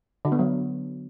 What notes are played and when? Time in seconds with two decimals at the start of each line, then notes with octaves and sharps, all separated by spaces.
0.25 D3
0.32 B3
0.39 F#3